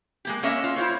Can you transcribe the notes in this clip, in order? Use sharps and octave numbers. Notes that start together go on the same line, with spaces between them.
G#3 A#3 G4
A#3 C#4 C#5 D#5 E5
F4
E4 F4 C5 C#5